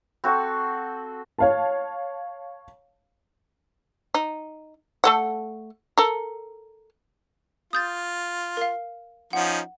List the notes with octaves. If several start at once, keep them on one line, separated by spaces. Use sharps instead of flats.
C4 F#4 A4
C#5 F5 A5
D#4
A3 A4 F#5
A4 A#4
F4 D#6 G6 A6
A#4 F5
F3 C#4 D#4 F#5